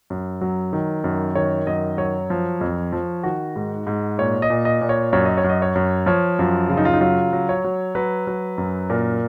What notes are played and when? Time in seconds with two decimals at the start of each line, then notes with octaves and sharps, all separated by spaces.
0.10 F#2
0.41 F#3
0.73 D#3
1.04 F#2
1.35 D#3 C#5
1.67 F#2 D#5
1.98 F#3 C#5
2.30 F3
2.61 F2
2.93 F3
3.23 D#3 F#4
3.56 G#2
3.87 G#2
4.18 A#2 C#5
4.42 D#5
4.50 A#2
4.65 D#5
4.81 A#2
4.89 C#5
5.13 F#2 C#5
5.25 D#5
5.37 C#5
5.44 F#2
5.49 D#5
5.62 C#5
5.75 F#2
6.06 F3 C#5
6.39 F#2 F4
6.70 C#3 F4
6.77 D#4
6.85 F4
6.93 D#4
7.01 F#3 F4
7.33 F#3
7.49 C#5
7.64 F#3
7.95 F#3 B4
8.27 F#3
8.58 F#2
8.90 A#2 A#4